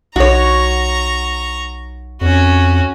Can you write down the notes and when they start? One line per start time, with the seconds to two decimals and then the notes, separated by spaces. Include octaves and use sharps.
0.16 B1 F#4 C#5 A#5 C#6
2.21 F2 C#4 F#4